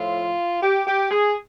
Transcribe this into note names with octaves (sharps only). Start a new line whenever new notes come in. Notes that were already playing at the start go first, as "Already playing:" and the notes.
Already playing: A2 F3 F4
G4
G4
G#4